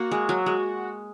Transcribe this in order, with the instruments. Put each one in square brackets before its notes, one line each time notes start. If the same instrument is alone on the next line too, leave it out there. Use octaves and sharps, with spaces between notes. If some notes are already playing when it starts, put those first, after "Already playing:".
Already playing: [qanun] A#3 [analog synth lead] F#4
[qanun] G#3
F#3
G#3